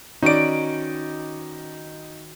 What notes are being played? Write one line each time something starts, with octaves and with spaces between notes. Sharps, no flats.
D#3 C#4 D#4 F#4 B4 D5 D7